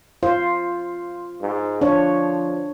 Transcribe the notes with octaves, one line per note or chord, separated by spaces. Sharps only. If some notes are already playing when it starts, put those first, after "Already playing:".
F4 C5
G#2
F3 D4 C#5